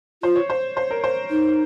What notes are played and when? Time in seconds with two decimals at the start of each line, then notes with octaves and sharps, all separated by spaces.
0.23 F4 C5
0.36 C#5
0.50 C5
0.77 C5
0.91 A#4
1.04 C5
1.31 D#4